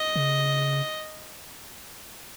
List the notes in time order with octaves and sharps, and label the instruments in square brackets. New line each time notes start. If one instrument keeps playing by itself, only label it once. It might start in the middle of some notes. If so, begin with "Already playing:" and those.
Already playing: [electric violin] D#5
[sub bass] C#3